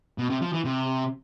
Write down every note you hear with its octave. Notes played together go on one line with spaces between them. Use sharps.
B2
C3
F3
E3
C3